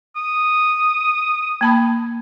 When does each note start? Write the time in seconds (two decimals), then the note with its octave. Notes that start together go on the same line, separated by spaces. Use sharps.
0.16 D#6
1.61 A#3 A5 B5